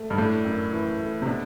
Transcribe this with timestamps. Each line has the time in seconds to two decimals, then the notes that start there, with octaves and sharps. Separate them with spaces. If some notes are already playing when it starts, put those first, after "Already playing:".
Already playing: A3
0.10 G2
0.18 A2 D4
0.45 F#2
0.73 E3
1.00 A3
1.22 C3
1.26 B2 D4